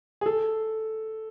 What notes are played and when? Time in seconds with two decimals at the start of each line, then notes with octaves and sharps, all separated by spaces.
0.21 G#4
0.26 A4